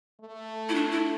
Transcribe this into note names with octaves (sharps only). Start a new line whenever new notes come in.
A3
E4
D4
E4